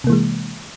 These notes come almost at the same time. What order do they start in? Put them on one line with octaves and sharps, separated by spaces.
C3 A#3 E3 G#3